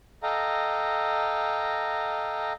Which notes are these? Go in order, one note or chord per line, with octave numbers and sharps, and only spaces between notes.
A4 D#5 F5 G5 A#5